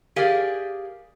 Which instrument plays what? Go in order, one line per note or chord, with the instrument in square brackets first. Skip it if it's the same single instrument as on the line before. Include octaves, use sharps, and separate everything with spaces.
[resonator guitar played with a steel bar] G4 G#4 A#4 D5 D#5 F5